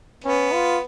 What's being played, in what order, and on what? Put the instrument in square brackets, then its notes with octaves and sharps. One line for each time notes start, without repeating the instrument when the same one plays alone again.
[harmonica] B3 [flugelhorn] C#4
[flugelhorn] F4